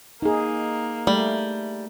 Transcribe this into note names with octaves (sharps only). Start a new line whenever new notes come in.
A#3 D#4 G#4
G3 A3